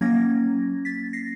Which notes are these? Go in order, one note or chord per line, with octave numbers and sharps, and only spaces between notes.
F#3 A#3 C#4 G#6 A#6
A6 B6
A#6 C7